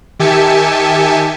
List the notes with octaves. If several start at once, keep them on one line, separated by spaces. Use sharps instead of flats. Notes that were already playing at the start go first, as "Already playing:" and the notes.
D#3 G4 E5 G#5 A5 C#7